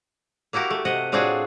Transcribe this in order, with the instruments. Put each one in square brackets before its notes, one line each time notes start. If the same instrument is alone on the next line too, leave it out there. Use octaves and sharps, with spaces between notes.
[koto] A#3 E4 F#4 G4 A#4
A3
C3 D#5 F#5
A2 C4 D4 F4 F#4 G#4